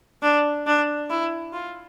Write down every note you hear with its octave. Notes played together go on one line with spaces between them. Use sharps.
D4
D4
E4
F4